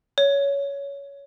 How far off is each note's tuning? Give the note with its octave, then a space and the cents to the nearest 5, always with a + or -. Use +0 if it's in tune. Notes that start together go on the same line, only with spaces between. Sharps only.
C#5 +15